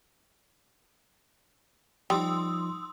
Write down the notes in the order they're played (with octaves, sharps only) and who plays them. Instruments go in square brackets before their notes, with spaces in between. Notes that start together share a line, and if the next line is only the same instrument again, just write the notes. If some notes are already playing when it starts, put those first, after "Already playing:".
[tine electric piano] F3 D#4 [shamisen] G3 [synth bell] C6 D#6 E6